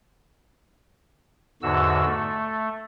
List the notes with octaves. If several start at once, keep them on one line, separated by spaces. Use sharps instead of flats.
E2 G#2 D3 F#4 E6
A3